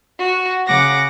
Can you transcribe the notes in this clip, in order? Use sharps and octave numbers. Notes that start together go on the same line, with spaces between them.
F#4
C#3 F#5 D6 A#6